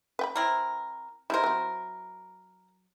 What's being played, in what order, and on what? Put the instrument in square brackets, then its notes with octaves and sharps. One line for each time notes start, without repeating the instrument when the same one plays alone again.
[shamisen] B4 G5 B5
[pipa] C4 E4 A#4
[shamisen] G3 D#4 C5 [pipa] E4 A#4
[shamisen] F#3 C4